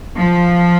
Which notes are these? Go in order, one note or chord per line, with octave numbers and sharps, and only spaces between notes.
F3